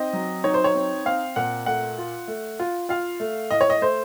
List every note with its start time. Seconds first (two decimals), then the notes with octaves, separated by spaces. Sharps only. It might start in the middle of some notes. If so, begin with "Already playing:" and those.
Already playing: C4 D#4 D#5
0.13 F#3
0.44 D#4 C#5
0.54 C5
0.64 C#5
0.75 C4
1.06 C4 F5
1.36 A#2 F#5
1.66 A3 F#5
1.98 F4
2.28 A3
2.60 F4
2.89 F4 F5
3.20 A3
3.51 A2 D#5
3.61 C#5
3.70 D#5
3.82 A3 C5